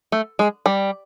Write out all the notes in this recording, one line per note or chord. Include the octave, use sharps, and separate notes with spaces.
A3
G#3
G3